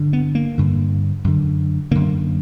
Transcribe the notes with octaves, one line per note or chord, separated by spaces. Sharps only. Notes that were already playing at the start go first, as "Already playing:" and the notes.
Already playing: G2 D3
B3
A#3
G2 D3
F#2 D3
F#2 D3 A#3